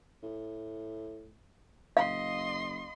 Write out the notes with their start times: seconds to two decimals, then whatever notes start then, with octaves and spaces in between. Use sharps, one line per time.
0.23 A2
1.97 F#1 D#5 F5 C6